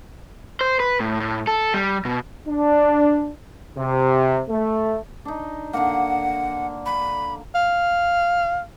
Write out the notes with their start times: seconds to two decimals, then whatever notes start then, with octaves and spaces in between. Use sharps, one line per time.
0.61 C5
0.80 B4
1.00 A2
1.20 A2
1.47 A4
1.74 G3
2.05 B2
2.48 D4
3.77 C3
4.49 A3
5.25 D4 D#4
5.73 D3 A#3 F#5
6.86 B5
7.55 F5